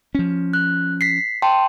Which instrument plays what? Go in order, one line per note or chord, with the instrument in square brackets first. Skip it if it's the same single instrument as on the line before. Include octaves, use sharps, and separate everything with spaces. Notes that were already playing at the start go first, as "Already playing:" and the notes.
[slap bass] F3 C#4
[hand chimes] F#6
B6 C7
G5 A5 C6